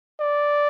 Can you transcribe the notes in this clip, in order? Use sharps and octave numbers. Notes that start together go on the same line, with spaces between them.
D5